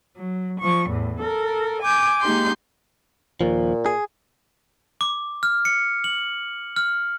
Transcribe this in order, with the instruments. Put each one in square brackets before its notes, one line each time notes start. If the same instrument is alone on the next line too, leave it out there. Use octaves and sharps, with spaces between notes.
[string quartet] F#3
F3 C#6
E2 A2
A4 A#4
G#5 D6 G6
G#3 A#3 D#4 G4 C6 G6
[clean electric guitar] D#2 F3 [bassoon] A#2
[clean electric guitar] G#4
[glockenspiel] D6
F6
C#7
F#7
F6